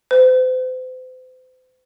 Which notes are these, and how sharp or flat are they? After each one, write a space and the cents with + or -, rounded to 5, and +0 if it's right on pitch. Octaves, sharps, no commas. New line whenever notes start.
C5 -40